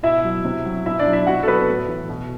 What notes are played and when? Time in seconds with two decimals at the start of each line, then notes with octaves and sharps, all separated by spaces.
0.03 B2 E4 E5
0.24 F#3
0.45 C3
0.65 F#3
0.86 B2 E4 E5
0.99 D4 D5
1.06 F#3
1.13 E4 E5
1.27 C3 F#4 F#5
1.43 A4
1.47 F#3 B3 B4
1.69 A2
1.88 E3
2.09 B2